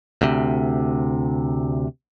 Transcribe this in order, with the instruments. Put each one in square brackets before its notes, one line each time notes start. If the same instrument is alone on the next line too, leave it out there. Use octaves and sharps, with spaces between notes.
[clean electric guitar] D2 C3